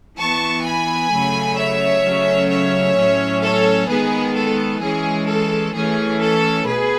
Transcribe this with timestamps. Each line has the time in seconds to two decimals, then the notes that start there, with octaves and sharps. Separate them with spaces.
0.17 E3 B3 A5 C#6
0.64 G#5 B5
1.10 C#3 F#3 A3
1.56 C#5 E5
2.04 C#3 F#3 A3 C#4
2.50 C#5 E5
2.96 A2 F#3 C#4
3.43 A4 C#5
3.88 D#3 G#3 B3 G#4 B4
4.35 A4
4.82 E3 G#3 C#4 G#4
5.28 A4
5.75 E3 A3 C#4 G#4
6.21 A4
6.67 B2 G#4 B4